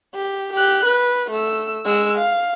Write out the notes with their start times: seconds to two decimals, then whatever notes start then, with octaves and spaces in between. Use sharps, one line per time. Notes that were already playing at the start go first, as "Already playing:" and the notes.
0.15 G4
0.53 G4 F#6
0.85 B4
1.30 A3 E6
1.85 G#3 E6
2.17 F5